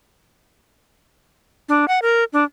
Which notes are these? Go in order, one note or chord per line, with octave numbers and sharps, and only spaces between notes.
D4
F#5
A#4
D4